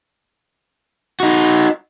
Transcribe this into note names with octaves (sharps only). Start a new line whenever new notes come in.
D#4 F#4